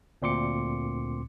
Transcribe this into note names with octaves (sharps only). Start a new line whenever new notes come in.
D2 A#2 C4 C6 D6 C#7